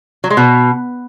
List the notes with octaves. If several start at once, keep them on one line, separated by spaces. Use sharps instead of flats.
F#3
G#3
B2